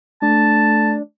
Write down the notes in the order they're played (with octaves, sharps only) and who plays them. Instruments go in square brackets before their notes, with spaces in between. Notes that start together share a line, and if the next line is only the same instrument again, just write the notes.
[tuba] A3 [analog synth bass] D4 [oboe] A5